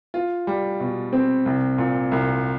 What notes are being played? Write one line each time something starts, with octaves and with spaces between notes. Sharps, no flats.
F4
G3
B2
C4
C2
A#2
C2